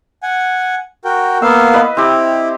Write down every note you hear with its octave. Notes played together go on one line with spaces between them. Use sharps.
F#5 G#5
F#4 A#4 G5
A#3 B3 F5 E6
B4 D#5 B5
C4 E4 G4